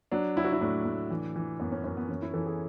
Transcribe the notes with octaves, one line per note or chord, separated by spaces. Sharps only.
F#3 D4
F#3 E4
F#4
E4
A2 D4
A2
E3
E3
F#2 B3
C#4
F#2 C#4
B3
E3 C#4
E4
E3 A4
G#4